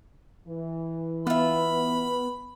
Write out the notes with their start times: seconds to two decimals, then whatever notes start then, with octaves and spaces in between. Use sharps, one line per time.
0.47 E3
1.27 B3 F4 E5 B5